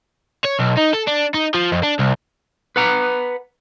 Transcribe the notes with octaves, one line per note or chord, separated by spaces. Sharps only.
C#5
B1
D#4
A4
D4
D#4
F3
F2
D4
C2
B4 F#5 A#5